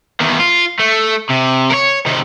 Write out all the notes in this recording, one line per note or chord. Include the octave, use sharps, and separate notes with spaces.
E2 D#3
F4
A3
C3
A#4 C#5
C3 D#3